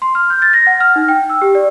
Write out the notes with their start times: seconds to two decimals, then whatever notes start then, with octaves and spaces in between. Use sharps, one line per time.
0.02 C6
0.15 F6
0.30 G6
0.42 A6
0.53 A#6
0.67 F#5
0.81 F6
0.96 D#4
1.08 G5
1.30 E6
1.42 G4
1.55 D5